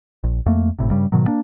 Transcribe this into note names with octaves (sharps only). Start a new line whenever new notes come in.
A#1
F2 A3 A#3
G#1 A2 C3
G2 C#3 G3
G#2 B2 D#3 F#3
A#3 D4